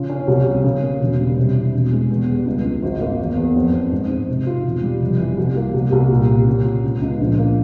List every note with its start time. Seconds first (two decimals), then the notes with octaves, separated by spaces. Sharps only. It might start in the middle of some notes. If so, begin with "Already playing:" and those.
Already playing: C#3 F4
0.10 C#4
0.27 C2
0.45 C2
0.64 C#3
0.82 A#3
1.01 E1
1.19 G3
1.37 C3
1.56 E4
1.73 E1
1.91 G#3
2.10 E2
2.28 G3
2.46 C#2
2.65 C#2
2.83 G#1
3.01 A#3
3.18 E2
3.37 E2
3.56 F2
3.73 C4
3.92 G#2
4.09 G#2
4.28 C3
4.47 F4
4.65 E1
4.83 G3
5.01 F1
5.19 E3
5.38 C2
5.56 A#3
5.74 C2
5.92 C2
6.10 A#2
6.28 G4
6.46 C#3
6.65 F4
6.83 C#2
7.02 C#2
7.19 A#1
7.38 A#3